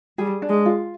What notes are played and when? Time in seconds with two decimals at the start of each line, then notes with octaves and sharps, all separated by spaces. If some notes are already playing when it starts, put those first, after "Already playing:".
0.18 G3 G#4
0.42 D4
0.49 G#3
0.65 F4